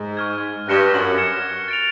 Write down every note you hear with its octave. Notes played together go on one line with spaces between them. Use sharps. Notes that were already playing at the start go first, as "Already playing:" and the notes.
Already playing: G#2
C#6 F6 G#6
G2 F#6 A#6 C#7 E7 G7
F#2
F6 G#6 C#7 E7
A6 D7 F7